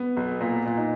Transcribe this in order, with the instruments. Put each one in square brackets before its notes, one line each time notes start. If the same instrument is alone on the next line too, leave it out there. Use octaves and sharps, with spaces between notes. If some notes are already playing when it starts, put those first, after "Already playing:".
Already playing: [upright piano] B3
[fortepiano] B1
A#2
A#2
[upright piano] D#4